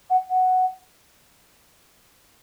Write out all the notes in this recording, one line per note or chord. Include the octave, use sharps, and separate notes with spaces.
F#5
F#5